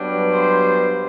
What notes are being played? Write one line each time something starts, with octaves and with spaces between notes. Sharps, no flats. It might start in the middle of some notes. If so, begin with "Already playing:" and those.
Already playing: G2 F#3 B3 D4
C5